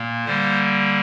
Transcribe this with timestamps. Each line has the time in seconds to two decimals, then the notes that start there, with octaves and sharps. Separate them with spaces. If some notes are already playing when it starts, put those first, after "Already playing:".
Already playing: A#2 A#3
0.26 D3 G3 A#3 C5